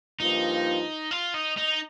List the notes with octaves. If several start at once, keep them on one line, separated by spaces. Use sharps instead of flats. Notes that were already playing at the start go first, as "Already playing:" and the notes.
G2 F3 A#3 D#4 F4
F4
D#4
D#4